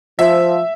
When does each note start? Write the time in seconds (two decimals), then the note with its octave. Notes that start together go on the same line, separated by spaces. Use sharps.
0.19 F3 E5